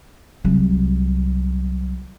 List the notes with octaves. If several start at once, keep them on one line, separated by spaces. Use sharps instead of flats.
C2 F#3